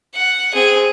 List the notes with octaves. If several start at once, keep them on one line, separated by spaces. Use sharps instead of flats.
F#5
C4 G#4